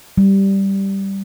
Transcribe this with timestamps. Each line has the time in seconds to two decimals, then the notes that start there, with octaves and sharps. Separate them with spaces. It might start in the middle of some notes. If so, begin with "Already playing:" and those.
0.18 G3